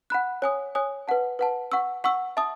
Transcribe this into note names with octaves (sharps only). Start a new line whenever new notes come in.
F#5 B5 F#6
C#5 G#5 D#6
C#5 G#5 D#6
B4 F#5 A5
B4 F#5 A5
F#5 C#6 E6
F#5 C#6 E6
E5 A5 D#6